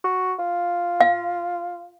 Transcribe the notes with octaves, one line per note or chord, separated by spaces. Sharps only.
F#4
F4
F5